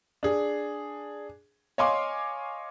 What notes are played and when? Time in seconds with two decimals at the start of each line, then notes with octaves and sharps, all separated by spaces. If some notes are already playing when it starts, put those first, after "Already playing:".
0.23 D4 G#4
1.78 C#5 D#5 F5 G#5 C6 D6